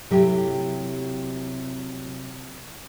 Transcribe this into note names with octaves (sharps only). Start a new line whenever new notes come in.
C3 F#3 A3 E4 G4